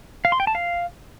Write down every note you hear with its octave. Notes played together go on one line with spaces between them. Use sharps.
F5
C6
G5
A5
F5